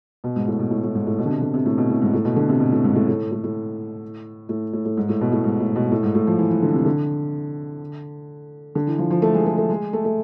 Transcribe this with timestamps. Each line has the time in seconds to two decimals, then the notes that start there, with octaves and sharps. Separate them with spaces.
0.24 B2
0.36 G#2
0.47 A2
0.59 B2
0.71 A2
0.83 A2
0.95 G#2
1.07 A2
1.18 B2
1.25 D3
1.30 C3
1.42 D3
1.54 C3
1.66 A2
1.78 B2
1.90 A2
2.02 G#2
2.13 A2
2.25 B2
2.36 D3
2.49 C3
2.60 B2
2.72 A2
2.84 G#2
2.95 A2
3.08 A2
3.32 A2
3.44 A2
4.49 A2
4.73 A2
4.85 A2
4.97 G#2
5.09 A2
5.21 B2
5.32 A2
5.44 G#2
5.60 A2
5.76 B2
5.91 A2
6.03 G#2
6.15 A2
6.27 F3
6.38 E3
6.51 E3
6.62 D3
6.74 C3
6.86 D3
8.75 D3
8.87 E3
8.98 F3
9.10 F3
9.22 A3
9.34 G#3
9.46 A3
9.57 A3
9.70 G#3
9.93 A3
10.04 A3